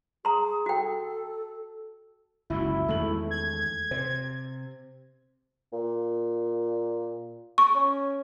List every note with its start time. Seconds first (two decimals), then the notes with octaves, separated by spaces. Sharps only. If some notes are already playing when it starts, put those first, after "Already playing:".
0.25 G#4 A#5 C6
0.66 F#4 A4 G5
2.50 F#1 C#2 D3 E4 F#4 E5
2.88 E2 D#3 G#3 A3 F#7
3.31 G#6
3.91 C3 C5
5.73 A#2
7.58 C#6
7.75 C#4